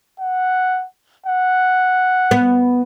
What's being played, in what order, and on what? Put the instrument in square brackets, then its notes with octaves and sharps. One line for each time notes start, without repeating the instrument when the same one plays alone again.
[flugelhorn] F#5
F#5
[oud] B3